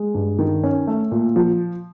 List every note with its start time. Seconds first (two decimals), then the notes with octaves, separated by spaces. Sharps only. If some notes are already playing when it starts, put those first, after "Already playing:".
Already playing: G#3
0.14 G2
0.39 D#3
0.63 C#4
0.87 A3
1.12 A#2
1.36 F3